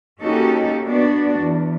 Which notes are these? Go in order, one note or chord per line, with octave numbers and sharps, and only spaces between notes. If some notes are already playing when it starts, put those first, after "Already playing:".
A#3 C#4 D#4 F#4 G4 A4
B3 D4 F#4 D5
E2